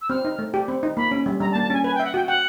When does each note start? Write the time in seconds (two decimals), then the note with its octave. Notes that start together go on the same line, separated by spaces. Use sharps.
0.01 E6
0.10 C4 F6
0.25 D#4
0.39 A3
0.54 G4
0.68 C4
0.83 D#4
0.97 A#3 B5
1.11 C#4
1.26 G3
1.41 G3 A#5
1.52 A5
1.55 A#3
1.62 A5
1.70 C#4 G#5
1.84 B4 G#5
1.94 G5
2.00 E5
2.05 F#5
2.14 F#4 G5
2.28 F#5 G5